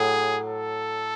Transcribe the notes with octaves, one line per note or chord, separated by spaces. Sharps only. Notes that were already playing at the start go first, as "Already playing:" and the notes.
Already playing: A2 F#3 G#4
A4